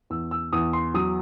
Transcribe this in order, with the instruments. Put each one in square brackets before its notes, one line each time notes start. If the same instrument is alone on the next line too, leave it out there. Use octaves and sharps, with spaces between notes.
[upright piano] E2 E6
E6
E2 D#6
C6
F#3 D#6